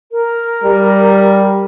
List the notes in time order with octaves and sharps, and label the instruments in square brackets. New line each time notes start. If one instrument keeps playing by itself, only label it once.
[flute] A#4
[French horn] G3